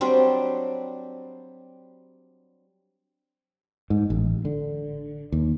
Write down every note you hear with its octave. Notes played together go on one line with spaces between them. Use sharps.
F#3 G3 C4 D4
G#2
A1
D3
D#2